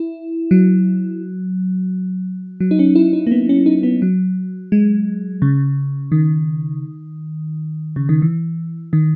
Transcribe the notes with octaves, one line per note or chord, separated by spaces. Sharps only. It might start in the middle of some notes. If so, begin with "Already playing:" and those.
Already playing: E4
F#3
F#3
D#4
C#4
E4
D#4
A#3
B3
C#4
D#4
B3
F#3
G#3
C#3
D#3
C#3
D#3
E3
D#3